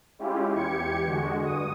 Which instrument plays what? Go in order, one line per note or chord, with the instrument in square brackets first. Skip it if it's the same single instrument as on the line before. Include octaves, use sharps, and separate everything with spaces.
[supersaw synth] G#3 C#4 E4 F4 G4
E2 G4 G#6 C#7
D3 G#3 F#4
G2 D#6